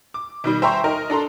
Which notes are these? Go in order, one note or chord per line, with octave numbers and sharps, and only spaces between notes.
D6
B2 D#3 G3
C5 E5 G5 A#5 C6 C#6
D#4 A#4 A#5
D4 A4 A#5 C6